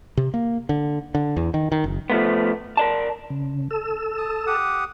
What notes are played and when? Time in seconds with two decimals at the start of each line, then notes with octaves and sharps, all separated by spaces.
0.17 C3
0.34 A#3
0.69 D3
1.15 D3
1.36 E2
1.54 D#3
1.72 D#3
1.84 F#1
2.10 F3 A3 B3
2.77 A#4 D5 A5
3.30 C#3
3.71 A4 E6
4.18 A5 D#6
4.47 G4 F#5 D#6